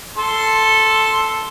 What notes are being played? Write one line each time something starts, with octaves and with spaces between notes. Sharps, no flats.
A4 C6